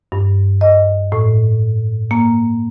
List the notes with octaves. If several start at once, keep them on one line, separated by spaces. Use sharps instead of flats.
G2
D#5
A2
A#3